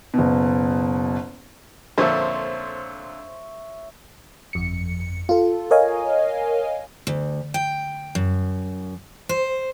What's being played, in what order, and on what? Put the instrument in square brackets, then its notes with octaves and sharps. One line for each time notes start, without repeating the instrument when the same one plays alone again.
[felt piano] F#1 B2
[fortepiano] F2 A#2 D3 [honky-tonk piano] C5 [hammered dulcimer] C#5 E5
[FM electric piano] G1 F2 C#7
F4 A4
A#4 C#5 D#5 F5 G#5
[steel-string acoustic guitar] D2
G5
F#2
C5